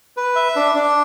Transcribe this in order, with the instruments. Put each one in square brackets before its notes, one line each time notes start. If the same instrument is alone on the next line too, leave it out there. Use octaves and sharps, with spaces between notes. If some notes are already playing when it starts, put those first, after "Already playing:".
[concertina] B4
E5
D4
D4